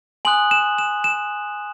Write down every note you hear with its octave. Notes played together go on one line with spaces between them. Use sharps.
G#5 C6 D#6 F#6 F#7
E7
E7
E7